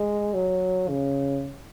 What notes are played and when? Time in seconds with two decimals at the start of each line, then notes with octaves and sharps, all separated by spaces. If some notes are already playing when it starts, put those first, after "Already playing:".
Already playing: G#3
0.34 F#3
0.89 C#3